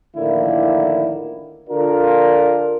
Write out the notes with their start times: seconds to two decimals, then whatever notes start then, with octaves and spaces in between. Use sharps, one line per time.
0.16 A2 D3 D#3 F3 A#3 E4
1.69 D3 D4 F4 A#4